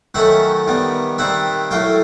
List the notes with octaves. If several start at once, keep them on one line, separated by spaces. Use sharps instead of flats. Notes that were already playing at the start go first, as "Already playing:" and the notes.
D#3 F#3 A3 C#4 E5 F#5
D#3 G3 B3
D#3 G3 C4 E5 F#5
A2 F#3 A3 F5 G5